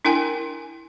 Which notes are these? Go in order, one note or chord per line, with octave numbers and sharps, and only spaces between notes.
D4 E4 A#4 G5 G#5